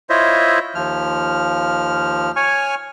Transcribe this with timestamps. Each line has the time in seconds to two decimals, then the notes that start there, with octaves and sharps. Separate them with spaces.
0.10 E4 F4 C5 C#5 D#5 E5
0.75 D#2 F3 F6
2.36 C#5 G#5 C#6 F6